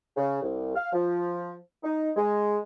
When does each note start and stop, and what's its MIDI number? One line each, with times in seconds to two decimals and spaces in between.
0.17 0.38 49
0.42 0.75 36
0.76 0.92 77
0.93 1.54 53
1.84 2.10 63
2.17 2.58 56